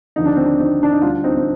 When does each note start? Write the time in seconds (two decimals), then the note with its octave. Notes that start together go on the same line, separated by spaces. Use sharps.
0.16 D#2 D3 F3 D#4
0.26 D4
0.36 C4
0.46 D4
0.59 C4 D#4
0.83 D4
0.93 D#4
1.02 D2 D3 G3 D4 F4
1.24 C4 D#4
1.37 C4